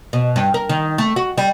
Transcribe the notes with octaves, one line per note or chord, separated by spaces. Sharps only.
B2
G2
A#4
D#3
A3
F#4
G3